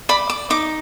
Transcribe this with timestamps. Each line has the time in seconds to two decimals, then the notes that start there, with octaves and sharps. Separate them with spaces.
0.09 D5 B5
0.30 D6
0.50 D#4 D6